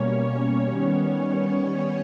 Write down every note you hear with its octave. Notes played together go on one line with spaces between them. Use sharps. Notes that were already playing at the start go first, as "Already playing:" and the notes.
Already playing: B2 G3 A#3 C#4 C#5
D#3 G3 B3